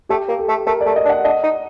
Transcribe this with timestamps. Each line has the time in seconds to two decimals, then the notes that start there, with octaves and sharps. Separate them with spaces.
0.09 A3 G4
0.28 A#3
0.38 A4
0.48 A3
0.66 A3 A#4
0.81 D5
0.86 A3
0.96 D#5
1.05 D4
1.10 F#5
1.25 D4 D#5
1.43 D#4